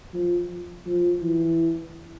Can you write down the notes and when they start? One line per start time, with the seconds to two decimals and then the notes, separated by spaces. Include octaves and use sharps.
0.14 F3
0.86 F3
1.21 E3